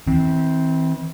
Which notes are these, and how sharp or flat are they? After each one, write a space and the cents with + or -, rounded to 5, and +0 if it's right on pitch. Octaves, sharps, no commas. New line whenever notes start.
E3 -35 C4 +0